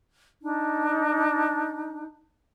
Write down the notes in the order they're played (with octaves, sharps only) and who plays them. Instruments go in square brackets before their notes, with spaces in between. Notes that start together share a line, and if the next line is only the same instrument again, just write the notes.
[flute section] D4 D#4